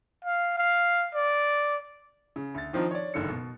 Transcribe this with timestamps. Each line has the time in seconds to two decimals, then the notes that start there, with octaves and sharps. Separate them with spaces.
0.25 F5
0.58 F5
1.14 D5
2.36 C#3
2.54 D2 A6
2.73 D#3 F3 C4 D4 D#4 F4
2.91 C#5 D5
3.14 F#1 G2 D3 D#3 A4 C#7
3.30 B2